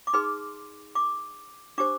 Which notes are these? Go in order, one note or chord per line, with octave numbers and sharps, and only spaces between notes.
D6
D#4 G#4 B4 C6
D6
D4 G4 C5 D6